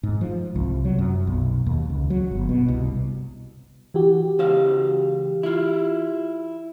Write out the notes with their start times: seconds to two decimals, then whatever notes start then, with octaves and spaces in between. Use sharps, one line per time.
0.03 G#2
0.21 F3
0.56 C2
0.85 F#3
0.99 F#2
1.27 B1
1.66 D#2
1.90 C#2
2.10 F#3
2.31 G1
2.49 B2
2.68 C2
3.94 E3 F#4 G4
4.39 C#2 C5 F5
5.43 E4 F4